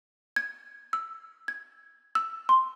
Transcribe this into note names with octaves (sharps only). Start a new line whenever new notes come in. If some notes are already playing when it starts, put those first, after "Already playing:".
G#6
E6
G#6
E6
C6